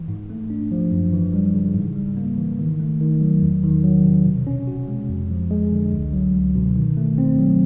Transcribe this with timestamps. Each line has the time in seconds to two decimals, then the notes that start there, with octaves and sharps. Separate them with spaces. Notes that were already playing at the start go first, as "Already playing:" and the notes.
Already playing: E3
0.08 G#2
0.30 A3
0.50 D4
0.71 F3
0.91 F#2
1.13 E3
1.34 G3
1.54 C#3
1.75 G#2
1.96 G3
2.17 A#3
2.38 E3
2.59 D#3
2.80 A3
3.00 D#3
3.21 F#3
3.42 E2
3.63 D#3
3.84 F#3
4.05 C3
4.26 B2
4.47 C#4
4.67 F#4
4.88 G#3
5.09 F2
5.30 F3
5.51 G#3
5.72 D3
5.92 C#2
6.13 F#3
6.34 C#2
6.55 B2
6.76 D#3
6.97 A3
7.18 C4
7.39 F#3